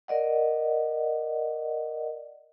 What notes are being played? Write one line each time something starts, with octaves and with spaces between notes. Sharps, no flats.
A#4 D5 D#5 F#5